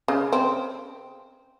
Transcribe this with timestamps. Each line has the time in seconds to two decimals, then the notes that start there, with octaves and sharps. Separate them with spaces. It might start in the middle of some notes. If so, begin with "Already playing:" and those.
0.08 C#3
0.33 C4